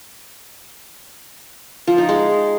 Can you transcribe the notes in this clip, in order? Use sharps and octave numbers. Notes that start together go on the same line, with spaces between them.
F3
D#4
G#3